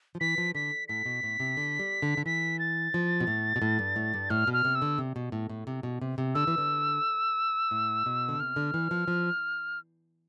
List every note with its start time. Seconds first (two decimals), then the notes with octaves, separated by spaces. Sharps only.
0.15 F3
0.20 E3 B6
0.38 F3
0.55 D3 B6
0.88 A2 B6
1.06 B2
1.23 A2
1.40 C3
1.57 D3
1.79 G3
2.02 D3
2.17 D3
2.26 E3 B6
2.59 A6
2.94 F3
3.20 B2
3.27 A2
3.56 B2
3.62 A2
3.79 G2
3.96 A2
4.14 G2
4.30 A2 F6
4.47 B2
4.53 F6
4.65 C3
4.75 E6
4.82 D3
4.98 C3
5.16 B2
5.32 A2
5.50 A2
5.67 C3
5.83 B2
6.01 C3
6.18 C3
6.35 D3 E6
6.47 E3
6.58 D3
7.71 A2
8.06 B2
8.29 D3
8.39 C3 F6
8.56 D3
8.74 E3
8.91 F3
9.08 F3